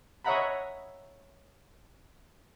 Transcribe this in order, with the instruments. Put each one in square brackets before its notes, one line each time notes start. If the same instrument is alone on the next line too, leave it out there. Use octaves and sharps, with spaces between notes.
[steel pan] C#5 D#5 E5 F#5 A#5 B5